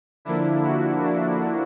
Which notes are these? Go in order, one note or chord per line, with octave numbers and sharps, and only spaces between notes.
D3 F3 A#3 D4 E4
E4 F#4
D4 E4